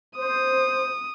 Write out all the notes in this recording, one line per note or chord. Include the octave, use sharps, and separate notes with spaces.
C5 D#6